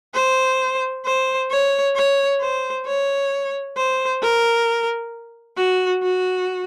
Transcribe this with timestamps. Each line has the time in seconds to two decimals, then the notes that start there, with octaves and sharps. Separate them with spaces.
0.14 C5
1.05 C5
1.50 C#5
1.95 C#5
2.41 C5
2.86 C#5
3.77 C5
4.22 A#4
5.57 F#4
6.03 F#4